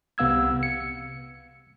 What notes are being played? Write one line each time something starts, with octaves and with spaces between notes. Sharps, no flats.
C2 C3 B3 F5 E6 G#6
C#7